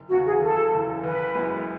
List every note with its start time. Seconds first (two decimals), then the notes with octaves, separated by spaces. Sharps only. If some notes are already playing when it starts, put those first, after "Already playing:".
Already playing: F#1
0.10 E2 C#3 E3 F#4
0.26 G#4
0.41 F#1 A4
0.72 E2 C#3 E3
1.03 F#1 B4
1.35 F#2 E3 G#3 B3